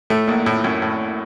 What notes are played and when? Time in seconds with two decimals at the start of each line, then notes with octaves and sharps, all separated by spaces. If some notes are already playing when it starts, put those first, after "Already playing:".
0.10 A2 A3
0.27 A#1 A#2
0.46 A2
0.64 F#2
0.82 A2